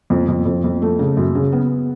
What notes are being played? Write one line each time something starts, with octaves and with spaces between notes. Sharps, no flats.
F2
F2
F2
F2
A3
C#3
F#2
C#3
B3